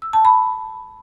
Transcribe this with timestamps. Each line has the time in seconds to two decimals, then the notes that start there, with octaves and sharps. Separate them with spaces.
0.02 E6
0.13 A5
0.25 B5